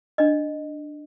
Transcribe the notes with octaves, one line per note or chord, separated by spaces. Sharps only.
D4 D#5